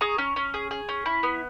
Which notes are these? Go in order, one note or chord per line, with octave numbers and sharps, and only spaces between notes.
G#4 A#5 C#6
C#4
C#4
G#4
G#4
C#4
E4
B3